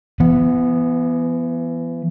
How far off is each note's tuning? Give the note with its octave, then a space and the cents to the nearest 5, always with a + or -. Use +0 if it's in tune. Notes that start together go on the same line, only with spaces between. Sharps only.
E3 +35 B3 +0